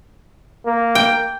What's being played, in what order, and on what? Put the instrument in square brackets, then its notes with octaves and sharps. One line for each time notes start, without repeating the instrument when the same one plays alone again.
[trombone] A#3
[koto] G5